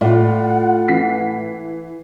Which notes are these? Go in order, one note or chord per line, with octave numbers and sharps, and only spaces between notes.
A2 F4 D5 F#5
E3 B6 C7